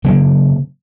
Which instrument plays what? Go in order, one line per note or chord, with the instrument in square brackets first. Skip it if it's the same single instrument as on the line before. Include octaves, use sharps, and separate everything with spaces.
[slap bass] C#3 F#3 A#3 C4